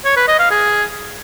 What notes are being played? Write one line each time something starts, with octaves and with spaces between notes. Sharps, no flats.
C#5
B4
D#5
F5
G#4